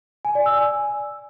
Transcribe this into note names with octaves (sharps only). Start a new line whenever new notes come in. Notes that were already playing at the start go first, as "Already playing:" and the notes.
G#5
D5
E6
G#5